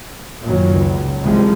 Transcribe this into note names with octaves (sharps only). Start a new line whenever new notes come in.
F#2 A#2 D#3 F#3
C#2
C2 C3 F3 G3 G#3